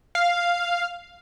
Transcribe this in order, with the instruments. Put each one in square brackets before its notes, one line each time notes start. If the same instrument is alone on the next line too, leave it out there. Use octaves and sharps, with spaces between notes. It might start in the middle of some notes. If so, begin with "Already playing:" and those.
[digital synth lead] F5